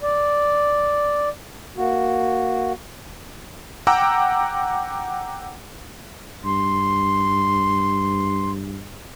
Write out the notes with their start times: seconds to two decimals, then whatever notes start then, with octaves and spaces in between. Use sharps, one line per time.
0.02 D5
1.77 A#3 F#4
3.87 F#5 G5 A#5 D6 E6
6.45 G2 C6